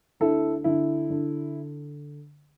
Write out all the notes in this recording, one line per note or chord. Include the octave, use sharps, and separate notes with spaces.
D2 E4 A4
D3 E4
D3